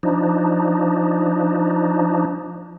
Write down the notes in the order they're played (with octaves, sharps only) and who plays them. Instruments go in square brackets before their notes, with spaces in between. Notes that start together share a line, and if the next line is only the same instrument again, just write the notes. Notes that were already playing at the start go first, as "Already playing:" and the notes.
[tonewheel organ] F3 D4 D#4